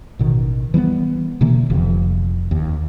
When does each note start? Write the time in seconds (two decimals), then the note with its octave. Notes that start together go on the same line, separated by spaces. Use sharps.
0.19 A1 B2 D#3
0.74 E3 G3 A#3 B3
1.41 B2 D3 E3 A#3
1.70 F1 F2 C3
2.51 D#2